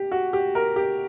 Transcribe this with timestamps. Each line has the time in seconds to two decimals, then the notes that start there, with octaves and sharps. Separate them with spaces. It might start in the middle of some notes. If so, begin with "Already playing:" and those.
Already playing: G4
0.12 F#4
0.33 G4
0.55 A#4
0.76 G4